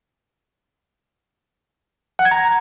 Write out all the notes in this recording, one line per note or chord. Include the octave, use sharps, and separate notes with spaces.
F#5
G#6
A#5